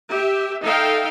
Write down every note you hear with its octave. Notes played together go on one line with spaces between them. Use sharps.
G4 E5
D#4 A4 E5 F5 G5